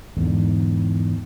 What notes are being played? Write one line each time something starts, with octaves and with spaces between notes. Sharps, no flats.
E2 G#2 D3